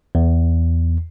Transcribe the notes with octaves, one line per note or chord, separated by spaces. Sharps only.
E2